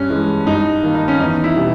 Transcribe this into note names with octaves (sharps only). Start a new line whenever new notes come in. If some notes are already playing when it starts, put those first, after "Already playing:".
Already playing: G2 C#4
E3 G#3
G2 D#4
D#3 A#3
D#4
C#4
E2 D#4
E4
B2 G3 B3